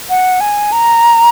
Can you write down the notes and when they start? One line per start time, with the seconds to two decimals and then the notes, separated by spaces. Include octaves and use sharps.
0.10 F#5
0.41 G#5
0.72 A#5